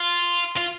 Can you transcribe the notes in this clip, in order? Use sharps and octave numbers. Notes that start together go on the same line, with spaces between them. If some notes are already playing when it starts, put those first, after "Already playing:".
Already playing: F4
F4